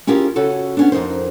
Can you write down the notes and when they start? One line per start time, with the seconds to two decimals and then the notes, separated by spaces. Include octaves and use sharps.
0.07 C#4 E4 F4 G4 G#4 A#4
0.36 C#3 C#4 F#4 A4
0.77 B3 C#4 D4
0.92 F2 D#4 A#4 C5